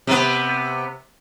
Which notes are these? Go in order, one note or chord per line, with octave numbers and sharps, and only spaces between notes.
C3 B3